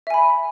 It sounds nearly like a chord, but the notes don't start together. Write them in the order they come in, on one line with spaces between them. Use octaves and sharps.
E5 G#5 B5